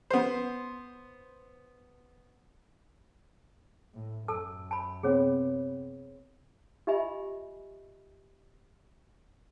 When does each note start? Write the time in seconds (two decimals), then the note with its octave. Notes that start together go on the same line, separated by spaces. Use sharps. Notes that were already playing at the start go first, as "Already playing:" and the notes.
0.10 B3 C5
3.95 A2
4.28 F#2 A4 A5 E6
4.71 A5 B5
5.03 C3 B3 C4 G#4 C#5
6.87 F4 G4 D#5 E5 G#5 B5